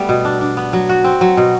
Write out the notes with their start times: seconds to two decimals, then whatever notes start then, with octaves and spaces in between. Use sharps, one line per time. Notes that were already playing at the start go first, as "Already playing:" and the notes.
Already playing: G3 A3 B3 A4
0.09 B2
0.25 D4
0.41 D4
0.57 B3
0.73 F#3
0.89 F#4
1.04 C4
1.21 F#3
1.37 B2